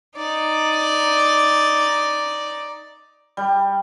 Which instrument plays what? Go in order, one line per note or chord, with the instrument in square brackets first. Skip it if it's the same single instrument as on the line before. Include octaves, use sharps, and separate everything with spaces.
[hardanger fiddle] D#4 D5
[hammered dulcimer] G3